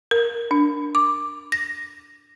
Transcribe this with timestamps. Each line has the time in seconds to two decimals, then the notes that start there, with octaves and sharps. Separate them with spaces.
0.11 A#4
0.51 D4
0.95 D6
1.52 A#6